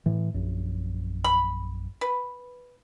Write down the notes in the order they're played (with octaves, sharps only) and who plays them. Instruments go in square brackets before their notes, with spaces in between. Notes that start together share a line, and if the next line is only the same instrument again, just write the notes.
[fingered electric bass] A2 E3
A#1 F#2
[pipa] B5
B4